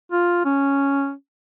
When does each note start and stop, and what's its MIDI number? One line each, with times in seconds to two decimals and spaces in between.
0.12 0.41 65
0.45 1.12 61